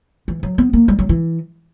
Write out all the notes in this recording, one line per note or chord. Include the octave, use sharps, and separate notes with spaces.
E3
F#3
B3
A#3
G3
F#3
E3